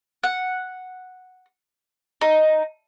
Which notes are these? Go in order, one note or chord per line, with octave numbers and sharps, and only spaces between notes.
F#5
D#4